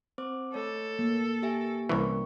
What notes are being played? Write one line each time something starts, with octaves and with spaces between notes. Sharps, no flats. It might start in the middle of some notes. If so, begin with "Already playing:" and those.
C4 C5 D6
A3 A4 C#5
A#3
G4 E5 G#5
C2 E3 C#4 A#4 C#6